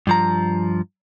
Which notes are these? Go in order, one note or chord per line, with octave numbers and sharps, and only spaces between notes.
G2 F3 A#5